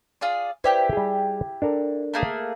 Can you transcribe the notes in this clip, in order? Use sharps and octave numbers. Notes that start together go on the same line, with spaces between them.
F4 G#4 D5
E4 G4 B4 C5 D5 G5
G3 G#4
D4 A4 A#4
A3 A#3 G#4